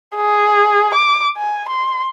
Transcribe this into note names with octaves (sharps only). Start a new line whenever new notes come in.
G#4
D6
G#5
C6